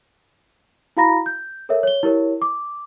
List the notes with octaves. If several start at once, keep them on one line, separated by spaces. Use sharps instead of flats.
E4 F#4 F5 A#5 B5 A#6
G6
A4 A#4 C#5 E5
C#5 G7
E4 G4 A#4 C#5
D6